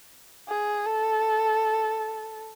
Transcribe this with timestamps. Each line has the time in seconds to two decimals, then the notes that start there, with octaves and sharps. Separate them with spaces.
0.49 G#4
0.86 A4